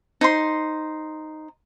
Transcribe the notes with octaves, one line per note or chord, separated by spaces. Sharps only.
D#4 C5 C6